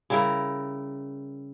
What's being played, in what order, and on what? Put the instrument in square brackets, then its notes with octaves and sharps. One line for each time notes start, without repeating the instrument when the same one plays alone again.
[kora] C#3 G3 E4 A#4